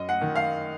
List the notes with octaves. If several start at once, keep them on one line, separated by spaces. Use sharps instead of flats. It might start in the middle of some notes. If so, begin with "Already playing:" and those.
Already playing: F#2 D#5
F#5
D#3
F5